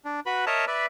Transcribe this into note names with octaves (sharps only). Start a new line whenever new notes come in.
D4
F#4 B4 B5
A#4 C#5 D#5 E5 A5 A#5
B4 D5 E5